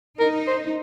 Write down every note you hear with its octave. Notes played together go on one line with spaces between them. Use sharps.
D#4 A#4
C5